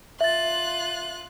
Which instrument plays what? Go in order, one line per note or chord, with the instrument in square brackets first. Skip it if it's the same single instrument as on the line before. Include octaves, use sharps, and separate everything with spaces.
[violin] F4 F#6 [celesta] E5 A6